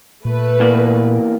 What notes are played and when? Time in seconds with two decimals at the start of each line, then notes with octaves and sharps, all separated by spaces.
0.25 A#2 A3 B4
0.60 E2 A#3 D5